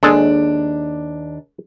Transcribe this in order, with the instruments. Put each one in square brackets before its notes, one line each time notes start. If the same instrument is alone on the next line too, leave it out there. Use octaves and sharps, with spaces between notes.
[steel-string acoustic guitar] D#2 D4 [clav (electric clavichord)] G#3 A4